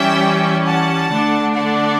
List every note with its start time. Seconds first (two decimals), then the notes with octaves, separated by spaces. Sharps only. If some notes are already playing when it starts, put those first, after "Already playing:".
Already playing: E3 G3 C#4 E5 G5
0.66 F#5 A5
1.10 D3 A3 D4
1.54 D5 F#5